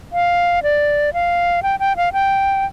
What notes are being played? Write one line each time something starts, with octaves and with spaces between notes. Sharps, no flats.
F5
D5
F5
G5
G5
F5
G5